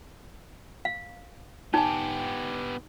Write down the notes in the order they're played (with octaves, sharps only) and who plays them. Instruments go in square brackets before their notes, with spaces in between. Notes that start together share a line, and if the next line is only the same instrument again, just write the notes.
[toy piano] F5
[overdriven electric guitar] B3 G4 [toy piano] D#4 G#5